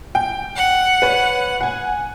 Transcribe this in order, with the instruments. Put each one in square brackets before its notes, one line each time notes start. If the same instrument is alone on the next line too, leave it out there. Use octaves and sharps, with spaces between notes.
[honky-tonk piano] G5
[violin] F#5
[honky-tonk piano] B4 C#5
F#5 G#5